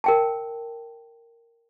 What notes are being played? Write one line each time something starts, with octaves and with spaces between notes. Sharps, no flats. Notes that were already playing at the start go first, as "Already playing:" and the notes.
A#4 G5 A5